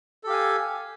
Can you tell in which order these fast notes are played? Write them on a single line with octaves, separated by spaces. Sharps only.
A4 G4 F5 G#5